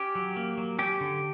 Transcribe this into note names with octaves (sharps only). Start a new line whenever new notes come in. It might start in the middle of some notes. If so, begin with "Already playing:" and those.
Already playing: C#4 G4
F#3
A#3
F#3
C#4 G4
D3